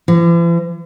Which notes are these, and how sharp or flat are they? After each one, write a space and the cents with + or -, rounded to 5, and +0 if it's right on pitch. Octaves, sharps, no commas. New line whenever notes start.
E3 +45